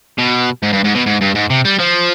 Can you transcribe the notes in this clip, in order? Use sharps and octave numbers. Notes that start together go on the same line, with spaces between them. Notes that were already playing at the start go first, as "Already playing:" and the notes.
B2
G#2
G2
G#2
B2
G#2
G2
G#2
C3
G3
F3